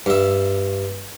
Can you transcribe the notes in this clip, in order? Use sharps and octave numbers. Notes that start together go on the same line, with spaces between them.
G2 E5